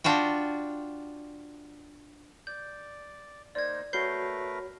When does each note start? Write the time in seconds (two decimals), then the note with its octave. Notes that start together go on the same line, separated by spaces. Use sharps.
0.04 D4 F4 F#4 G5
2.47 D5 G6
3.55 A#3 D#4 C5 D5 G#6
3.93 A3 F#4 A#4 B4 C#5 G6 C7 G7